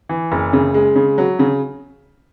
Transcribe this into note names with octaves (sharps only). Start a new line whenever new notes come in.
E3
F#1
C#3
G#3
C#3
F#3
C#3